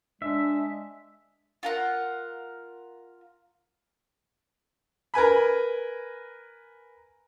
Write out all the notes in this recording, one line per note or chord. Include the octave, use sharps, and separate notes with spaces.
G#3 D4 E5
F4 A#4 F#5
A#4 B4 G#5 B5